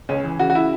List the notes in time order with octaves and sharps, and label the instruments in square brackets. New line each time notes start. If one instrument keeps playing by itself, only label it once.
[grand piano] C#2 C#4
E3
C#3 F#4
F#4
E4